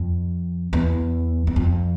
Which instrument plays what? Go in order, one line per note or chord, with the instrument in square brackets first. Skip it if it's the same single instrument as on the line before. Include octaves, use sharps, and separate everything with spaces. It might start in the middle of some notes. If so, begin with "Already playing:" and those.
Already playing: [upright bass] F2
E2
E2
F2